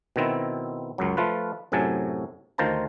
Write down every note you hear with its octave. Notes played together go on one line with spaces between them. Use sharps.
B2 D#3 C4 E4
C#2 F#2 F#3
F3 A3 F4 B4
F#2 A2 C3 F#3 G#5 A5
D2 D#3 F4 C5 A5 A#5